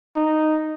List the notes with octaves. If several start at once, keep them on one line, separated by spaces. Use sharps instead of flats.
D#4